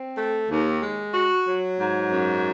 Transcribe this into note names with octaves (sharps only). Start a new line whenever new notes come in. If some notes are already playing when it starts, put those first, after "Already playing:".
Already playing: C4
A3
D#2
G#3
F#4
F#3
G#2
F#2